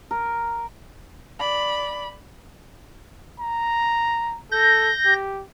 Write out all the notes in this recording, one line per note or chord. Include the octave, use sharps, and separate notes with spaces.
A#4
D5 B5
A#5
A4 G6 A#6
G4